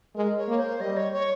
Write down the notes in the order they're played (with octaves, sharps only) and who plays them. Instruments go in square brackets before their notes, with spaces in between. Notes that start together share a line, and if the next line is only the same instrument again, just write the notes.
[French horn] G#3 [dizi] A#4
[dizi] C#5
[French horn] A#3
[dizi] C5
[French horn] G3 [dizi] D#5
[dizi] C#5
C#5